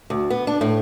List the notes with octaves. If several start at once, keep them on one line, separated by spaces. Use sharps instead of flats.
D2
B3
D4
A2